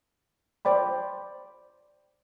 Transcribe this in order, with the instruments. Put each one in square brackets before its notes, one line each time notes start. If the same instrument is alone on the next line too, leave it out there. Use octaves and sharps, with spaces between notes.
[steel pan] C5 D5 G5 B5